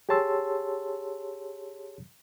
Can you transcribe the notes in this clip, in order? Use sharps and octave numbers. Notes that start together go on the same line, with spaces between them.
G4 G#4 C#5 A5 C6 E6